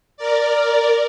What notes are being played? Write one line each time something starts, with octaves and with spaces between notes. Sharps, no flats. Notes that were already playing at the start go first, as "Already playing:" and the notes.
A#4 D5